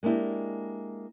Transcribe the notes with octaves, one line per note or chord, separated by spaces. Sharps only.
G#3 A#3 D4 E4 G4